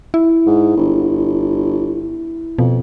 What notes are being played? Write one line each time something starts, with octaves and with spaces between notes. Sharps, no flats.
E4
G#2
G1
F2 B2